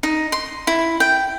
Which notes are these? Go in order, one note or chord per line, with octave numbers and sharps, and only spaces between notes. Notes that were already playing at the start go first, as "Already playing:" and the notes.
D#4
C6
E4
G5